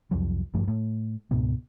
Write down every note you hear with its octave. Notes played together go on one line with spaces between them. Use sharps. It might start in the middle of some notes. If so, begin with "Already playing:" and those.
C2 F2 F3 F#3
A1 G2 F3 A3
A2 A3
C#2 G#2 B2 B3